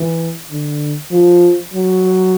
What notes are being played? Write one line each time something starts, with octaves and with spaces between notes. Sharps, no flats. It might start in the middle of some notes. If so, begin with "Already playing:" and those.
Already playing: E3
D3
F3
F#3